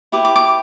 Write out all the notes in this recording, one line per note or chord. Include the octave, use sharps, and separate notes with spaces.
E4 G4 B4 D6
D6
D6